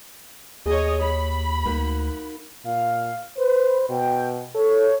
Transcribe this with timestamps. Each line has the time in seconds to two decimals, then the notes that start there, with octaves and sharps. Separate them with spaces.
0.66 D#2 G#4 C#5 D#5
1.01 C#5 B5
1.65 D2 A#3 D#4 F#4
2.65 A#2 F5
3.37 B4 C5
3.89 B2 G5
4.55 A4 C#5